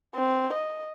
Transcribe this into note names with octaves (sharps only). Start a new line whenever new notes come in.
C4
D#5